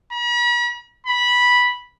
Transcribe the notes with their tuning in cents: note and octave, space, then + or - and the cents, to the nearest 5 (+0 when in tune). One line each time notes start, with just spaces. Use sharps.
B5 -45
B5 -10